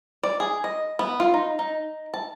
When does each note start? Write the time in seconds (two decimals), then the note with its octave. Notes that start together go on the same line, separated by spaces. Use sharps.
0.23 D5
0.40 G#4
0.64 D#5
0.99 B3
1.20 F4
1.34 D#4
1.59 D#4
2.14 A5